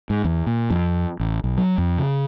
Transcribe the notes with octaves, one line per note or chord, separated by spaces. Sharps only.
G#2
E2
A#2
F2
A1
B1
F#3
F2
C#3